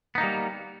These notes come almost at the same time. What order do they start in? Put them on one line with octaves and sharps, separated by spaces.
B3 D#4 A#3 G3